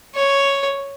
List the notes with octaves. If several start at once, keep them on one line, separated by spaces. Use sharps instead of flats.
C#5